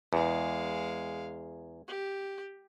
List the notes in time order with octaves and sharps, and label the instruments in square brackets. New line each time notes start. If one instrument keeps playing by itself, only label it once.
[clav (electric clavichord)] E2 [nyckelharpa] G#3 F5
[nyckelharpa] G4